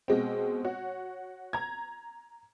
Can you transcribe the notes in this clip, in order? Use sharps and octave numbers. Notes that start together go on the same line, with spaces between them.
B2 G#3 C4
F#4 C#5
A#5 G#6